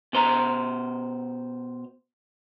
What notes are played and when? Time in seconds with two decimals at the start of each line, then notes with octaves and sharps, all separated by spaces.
0.13 B2 C5 A#5